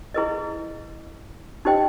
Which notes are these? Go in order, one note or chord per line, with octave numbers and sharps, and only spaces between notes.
E4 G#4 B4 D#5
D#4 G4 C5 D#5 G5